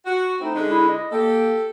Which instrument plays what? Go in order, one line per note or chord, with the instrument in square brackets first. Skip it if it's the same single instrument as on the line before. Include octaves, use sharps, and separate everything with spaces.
[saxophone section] F#4
[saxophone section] A3 C4 E4 [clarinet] D#4
[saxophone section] D3 G#3
[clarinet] E4
D#5
[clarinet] A#3 [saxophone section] G4 A4